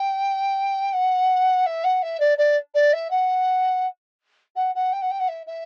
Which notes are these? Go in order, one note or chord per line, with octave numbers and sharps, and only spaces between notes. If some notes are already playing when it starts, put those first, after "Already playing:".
Already playing: G5
F#5
E5
F#5
E5
D5
D5
D5
E5
F#5
F#5
F#5
G5
F#5
G5
F#5
E5
E5